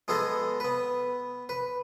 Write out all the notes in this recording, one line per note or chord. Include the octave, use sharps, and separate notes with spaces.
G#3 B3 G#4 A4 D#5
B3 B4
B4